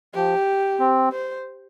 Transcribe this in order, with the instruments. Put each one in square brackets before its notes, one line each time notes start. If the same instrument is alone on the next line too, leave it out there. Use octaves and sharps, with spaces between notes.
[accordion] F3 [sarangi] G4
[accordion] C4
[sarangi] C5